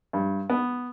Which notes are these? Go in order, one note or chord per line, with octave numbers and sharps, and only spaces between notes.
G2
B3